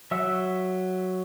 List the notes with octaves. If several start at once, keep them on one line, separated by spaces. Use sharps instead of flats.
F#3 E5 F#5 E6